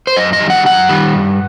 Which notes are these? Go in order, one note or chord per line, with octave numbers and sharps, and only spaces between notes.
C5
F#2 D#5
D#5
D#3 G3
F#5
F#2 F#5
D#3 G3
G2